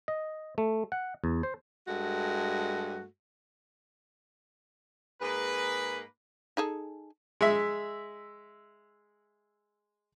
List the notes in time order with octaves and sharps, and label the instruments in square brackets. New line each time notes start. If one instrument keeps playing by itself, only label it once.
[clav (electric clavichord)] D#5
A3
F#5
E2
C5
[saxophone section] G2 G#3 A3 F#4
[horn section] G#2 A#3 G#4 B4
[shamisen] D#4 G#4 A4
[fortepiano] G#3 E5